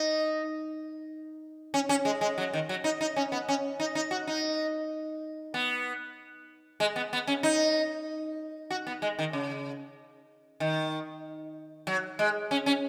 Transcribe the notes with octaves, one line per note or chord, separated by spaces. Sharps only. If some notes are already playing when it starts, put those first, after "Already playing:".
Already playing: D#4
C#4
C#4
G#3
G#3
F#3
D#3
F#3
D#4
D#4
C#4
B3
C#4
D#4
D#4
F#4
D#4
B3
G#3
B3
B3
C#4
D#4
F#4
B3
G#3
D#3
C#3
D#3
F#3
G#3
C#4
C#4